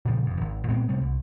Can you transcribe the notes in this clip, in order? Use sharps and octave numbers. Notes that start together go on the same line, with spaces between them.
A#2 C#3 F3 G3
F1 F2
G#1
A#2 G#3 B3 C4
C3 G3 A3
C2